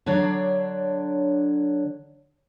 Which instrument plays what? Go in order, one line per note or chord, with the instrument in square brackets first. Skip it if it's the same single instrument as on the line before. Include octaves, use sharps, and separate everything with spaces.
[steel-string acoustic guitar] D3 F#3 D4 C#5 D5